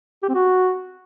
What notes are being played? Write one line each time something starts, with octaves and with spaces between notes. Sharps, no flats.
G4
C4
F#4